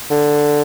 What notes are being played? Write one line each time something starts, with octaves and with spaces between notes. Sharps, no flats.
D3